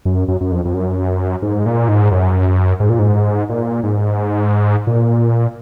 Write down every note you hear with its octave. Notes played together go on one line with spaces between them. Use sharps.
F#2
F#2
F#2
F2
F2
F#2
G#2
A#2
G#2
F#2
G#2
A#2
G#2
A#2
G#2
A#2